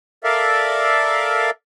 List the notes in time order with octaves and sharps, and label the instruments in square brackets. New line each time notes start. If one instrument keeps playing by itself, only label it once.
[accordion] A4 A#4 D5 E5 F5